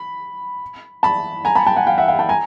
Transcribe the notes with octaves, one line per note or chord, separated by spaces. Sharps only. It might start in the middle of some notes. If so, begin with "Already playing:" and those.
Already playing: B5
A5 B5
G#5 A#5
A5 B5
G5 A5
F#5 G#5
F5 G5
E5 F#5
F5 G5
G5 A5
G#5 A#5